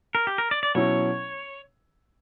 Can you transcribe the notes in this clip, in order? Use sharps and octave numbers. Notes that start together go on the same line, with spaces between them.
A#4
G4
A#4
D5
D5
B2 F#3 C#4 E4 C#5